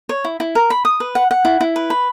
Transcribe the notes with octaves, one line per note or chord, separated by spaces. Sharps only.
C#5
E4
E4
A#4
B5
D#6
B4
F#5
F#5
E4
E4
B4
B5